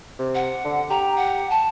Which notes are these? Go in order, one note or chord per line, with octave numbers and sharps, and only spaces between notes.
C3
F#5
D3
G4 A#5
F#5
A5